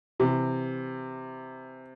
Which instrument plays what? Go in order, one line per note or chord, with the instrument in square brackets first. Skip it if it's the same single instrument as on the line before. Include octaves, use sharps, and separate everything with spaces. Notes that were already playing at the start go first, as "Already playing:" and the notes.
[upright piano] C3 E3